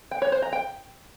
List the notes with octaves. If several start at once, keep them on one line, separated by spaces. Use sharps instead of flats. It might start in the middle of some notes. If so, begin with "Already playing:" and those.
G5
C#5
C5
A#5
G5